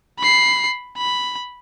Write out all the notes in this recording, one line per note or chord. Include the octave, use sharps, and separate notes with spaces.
B5 C7
B5